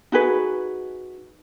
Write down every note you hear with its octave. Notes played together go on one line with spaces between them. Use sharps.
D#4 F#4 G#4 B4